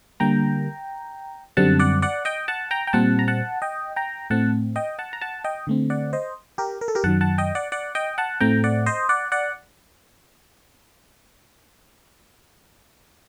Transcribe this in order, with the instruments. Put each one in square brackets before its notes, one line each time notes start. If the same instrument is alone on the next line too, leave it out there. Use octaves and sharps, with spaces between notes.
[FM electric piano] D3 G3 A#3 G5 A#5
F#2 D3 G3 C4 F#5 A5
D5 F#5
D5 F#5
D#5 G5
F#5 A5
G5 A#5
G5
A#2 G3 C4 F#5 A5
A#5
F#5 A5
D#5 G5
G5 A#5
A2 A3 C4 F#5 A5
D#5 G5
F#5 A5
A#5
F#5 A5
D#5 G5
D3 A3 C4
D5 F#5
C5 D#5
G4 A#4
A#4
A4
G4 A#4
F#2 D#3 F#3 F#5 A5
F#5 A5
D#5 G5
D5 F#5
D5 F#5
D#5 G5
F#5 A5
A2 A3 C4 G5 A#5
D5 F#5
C5 D#5
D5 F#5
D5 F#5